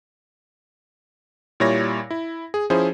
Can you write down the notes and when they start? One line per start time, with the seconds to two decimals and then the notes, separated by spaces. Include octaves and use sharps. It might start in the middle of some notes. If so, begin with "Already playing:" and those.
1.60 A#2 G3 E4 C#5 A#6
2.11 E4
2.54 G#4
2.70 F3 C#4 E4 G#4 C5